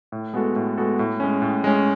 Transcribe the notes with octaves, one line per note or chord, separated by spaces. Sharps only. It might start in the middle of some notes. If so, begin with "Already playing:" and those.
A2
G#3 B3 F#4 A4
A2
G#3 B3 F#4 A4
A2
G#3 C#4
A2
G#3 C#4